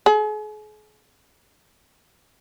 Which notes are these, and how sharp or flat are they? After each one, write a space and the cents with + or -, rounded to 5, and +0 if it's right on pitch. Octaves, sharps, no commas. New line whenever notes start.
G#4 +40